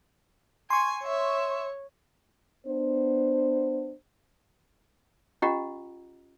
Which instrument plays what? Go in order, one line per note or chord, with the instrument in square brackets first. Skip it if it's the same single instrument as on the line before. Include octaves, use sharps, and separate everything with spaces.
[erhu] G#5 [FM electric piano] C6 C#6
[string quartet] C#5 [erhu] E5
[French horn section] B3 D4 C5
[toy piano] C#4 F4 G4 D#5 F#5 A#5